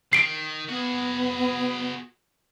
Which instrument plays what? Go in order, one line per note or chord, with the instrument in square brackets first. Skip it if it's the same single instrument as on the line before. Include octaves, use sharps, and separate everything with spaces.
[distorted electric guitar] D#3 [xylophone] C7 D7
[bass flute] B3 [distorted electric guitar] F#4 G#4